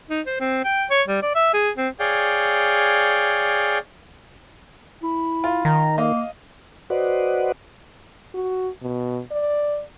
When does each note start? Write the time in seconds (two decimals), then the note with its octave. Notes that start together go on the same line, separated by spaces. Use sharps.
0.10 D#4
0.26 C5
0.40 C4
0.64 G5
0.90 C#5
1.07 G3
1.22 D5
1.35 E5
1.54 G#4
1.77 C4
1.99 G#4 C#5 D5 F5 G5
5.03 E4
5.44 F4
5.65 D#3 A#5
5.98 A#3 D#5 F5
6.90 F#4 B4 C5 D5 D#5 F#5
8.34 F#4
8.82 B2
9.31 D5